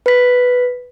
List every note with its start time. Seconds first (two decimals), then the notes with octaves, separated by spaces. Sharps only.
0.06 B4 B6